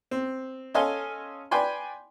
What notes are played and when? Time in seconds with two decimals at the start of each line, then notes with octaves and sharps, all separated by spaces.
0.11 C4
0.74 C#4 A4 D#5 F5 G#5 C6
1.51 B4 D5 G5 G#5 C6